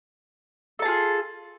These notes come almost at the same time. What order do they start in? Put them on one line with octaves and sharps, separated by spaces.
A4 A5 G#4 F4